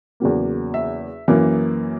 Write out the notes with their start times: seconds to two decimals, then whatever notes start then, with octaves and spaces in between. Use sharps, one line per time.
0.20 E2 C#3 F#3 A#3
0.74 E5
1.28 F#2 E3 A#3